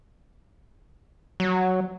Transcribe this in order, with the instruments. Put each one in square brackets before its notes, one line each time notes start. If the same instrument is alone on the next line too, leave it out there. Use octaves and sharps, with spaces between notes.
[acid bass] F#3